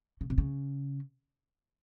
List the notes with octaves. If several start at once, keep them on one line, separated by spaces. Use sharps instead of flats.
C#3
C3
C#3